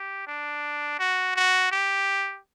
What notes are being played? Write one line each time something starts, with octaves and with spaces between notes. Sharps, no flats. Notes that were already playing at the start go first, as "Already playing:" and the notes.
Already playing: G4
D4
F#4
F#4
G4